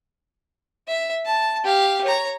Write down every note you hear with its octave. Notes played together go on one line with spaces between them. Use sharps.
E5
A5
G4 F5
C#5 A#5